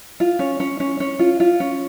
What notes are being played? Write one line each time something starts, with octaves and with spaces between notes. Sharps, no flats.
F4
C#4
C#4
C#4
C#4
F4
F4
C#4